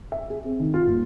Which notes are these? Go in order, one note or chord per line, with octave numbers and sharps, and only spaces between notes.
E5
G#4
C4
D#3
F4
D#1